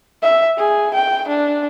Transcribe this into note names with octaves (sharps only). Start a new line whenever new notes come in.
E5
G#4
G5
D4